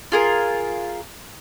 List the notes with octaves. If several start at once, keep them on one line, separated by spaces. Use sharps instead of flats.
F4 G#4 A#4